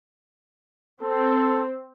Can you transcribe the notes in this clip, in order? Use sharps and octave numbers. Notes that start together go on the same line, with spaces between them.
C4 A4